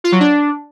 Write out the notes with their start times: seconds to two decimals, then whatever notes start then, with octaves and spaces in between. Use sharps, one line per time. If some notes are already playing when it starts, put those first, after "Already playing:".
0.04 F4
0.12 F#3
0.20 D4